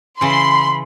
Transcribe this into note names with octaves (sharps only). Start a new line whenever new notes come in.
C#3 E3 B5 C6